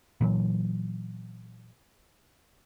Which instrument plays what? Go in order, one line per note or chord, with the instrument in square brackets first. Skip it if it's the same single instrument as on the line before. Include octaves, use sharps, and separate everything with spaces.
[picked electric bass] A#2 E3 F#3